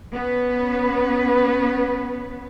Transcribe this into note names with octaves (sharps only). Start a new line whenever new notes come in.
B3 C#4 B4